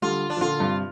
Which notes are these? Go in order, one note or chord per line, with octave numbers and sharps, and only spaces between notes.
D3 G3 F4
D4
F3
A#2 D3 F4
G2 C3